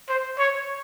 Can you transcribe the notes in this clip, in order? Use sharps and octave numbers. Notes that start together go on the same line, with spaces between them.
C5
C#5